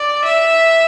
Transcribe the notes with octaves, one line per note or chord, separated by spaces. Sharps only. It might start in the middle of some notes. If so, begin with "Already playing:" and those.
Already playing: D5
E5